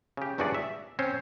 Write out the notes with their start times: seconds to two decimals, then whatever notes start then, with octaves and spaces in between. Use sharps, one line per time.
0.17 C#3 G4
0.38 E2 G2 C#4 F#4 G#4 D5
0.54 E5
0.99 C4 C#4 C5 C#5